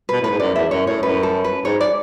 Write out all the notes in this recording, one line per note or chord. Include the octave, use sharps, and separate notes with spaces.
B2 B4
A2 B4
G#2
F#2 D5
E2 E5
F#2 C#5
A2 C#5
F#2 B4
A4
B4
G#2 C#5
D5